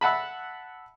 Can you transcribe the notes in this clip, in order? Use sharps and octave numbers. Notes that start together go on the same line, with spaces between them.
E5 F#5 A5 B5